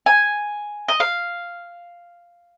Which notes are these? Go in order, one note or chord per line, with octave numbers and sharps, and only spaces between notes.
G#5
D#5
F5